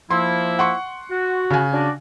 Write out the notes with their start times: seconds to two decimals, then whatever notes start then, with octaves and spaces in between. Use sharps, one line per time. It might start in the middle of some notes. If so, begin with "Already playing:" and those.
0.10 F3 A#3 E4 C6
0.59 F#5 C6 C#6
1.11 F#4
1.50 C#3 G#5
1.73 D4 F#4 D5